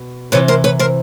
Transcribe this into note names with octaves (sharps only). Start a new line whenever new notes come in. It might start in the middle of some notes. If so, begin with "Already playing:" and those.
Already playing: B2
C3 E3 B4 C#5
A#4 C5
B4 C#5
A#4 C5